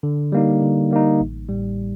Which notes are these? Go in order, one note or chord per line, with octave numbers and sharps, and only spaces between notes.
D3
G3 A#3 D#4
D3
G3 A#3 D#4
A1
A2 G3